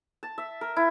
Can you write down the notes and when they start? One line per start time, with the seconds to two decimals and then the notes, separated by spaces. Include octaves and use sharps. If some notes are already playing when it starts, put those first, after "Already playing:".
0.23 A5
0.38 E5
0.61 A#4
0.76 E4